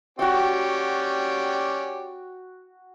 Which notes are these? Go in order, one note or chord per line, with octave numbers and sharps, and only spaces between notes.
C#4 F#4 G4 D5 G5